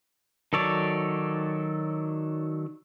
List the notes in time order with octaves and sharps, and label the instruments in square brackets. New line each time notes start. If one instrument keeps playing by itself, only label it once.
[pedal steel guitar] D#3 F#3 A4 C#5 D5